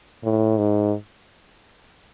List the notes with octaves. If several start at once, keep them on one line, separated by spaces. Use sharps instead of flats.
A2
G#2